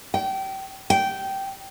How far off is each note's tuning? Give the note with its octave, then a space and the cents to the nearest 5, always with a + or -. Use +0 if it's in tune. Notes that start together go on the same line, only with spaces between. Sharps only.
G5 -25
G5 -15